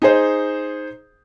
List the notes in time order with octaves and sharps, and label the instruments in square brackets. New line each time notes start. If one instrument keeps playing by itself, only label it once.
[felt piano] D#4 G#4 C5